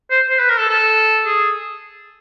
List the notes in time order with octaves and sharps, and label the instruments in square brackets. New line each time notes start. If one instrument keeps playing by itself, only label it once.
[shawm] C5
C5
B4
A#4
A4
A4
G#4